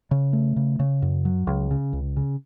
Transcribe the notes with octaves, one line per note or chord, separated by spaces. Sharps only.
C#3
A3
C#3
C#3
F#2
F#3
C#2
C#3
C#2
C#3